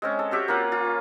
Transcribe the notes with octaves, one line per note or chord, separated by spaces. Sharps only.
G#3 C4 C#4
A4
C4 F#4 G4 E5
A#3 C#4 F4 F#5
F4
C#4